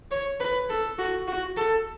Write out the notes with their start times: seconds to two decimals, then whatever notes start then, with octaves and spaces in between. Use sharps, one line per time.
0.11 C#5
0.40 B4
0.69 A4
0.98 F#4
1.27 F#4
1.56 A4